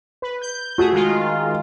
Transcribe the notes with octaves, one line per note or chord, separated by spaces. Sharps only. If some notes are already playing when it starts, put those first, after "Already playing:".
B4
G6
A3 F#4 G#4
D#3 G#3 F4